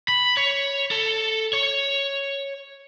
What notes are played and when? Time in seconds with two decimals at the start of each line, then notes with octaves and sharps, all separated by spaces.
0.08 B5
0.37 C#5
0.91 A4
1.53 C#5